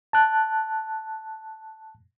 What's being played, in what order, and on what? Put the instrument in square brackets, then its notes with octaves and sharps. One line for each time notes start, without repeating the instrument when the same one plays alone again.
[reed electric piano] A5 F#6